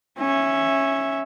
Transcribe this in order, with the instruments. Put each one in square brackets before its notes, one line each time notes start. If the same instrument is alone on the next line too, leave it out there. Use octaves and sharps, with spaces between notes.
[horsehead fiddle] C#4 E5